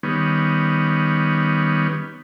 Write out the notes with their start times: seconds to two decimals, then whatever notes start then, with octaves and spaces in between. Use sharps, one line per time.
0.03 D#3 G3 B3 C#4